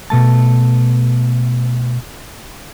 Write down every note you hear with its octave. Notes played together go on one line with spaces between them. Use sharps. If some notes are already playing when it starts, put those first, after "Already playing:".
B2 A3 A5